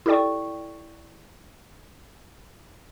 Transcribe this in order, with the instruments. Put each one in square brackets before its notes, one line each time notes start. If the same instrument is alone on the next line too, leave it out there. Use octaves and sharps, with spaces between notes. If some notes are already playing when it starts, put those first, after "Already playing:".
[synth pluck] E4 G4 A4 D5 G5 C#6